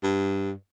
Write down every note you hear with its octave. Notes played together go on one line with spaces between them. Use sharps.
G2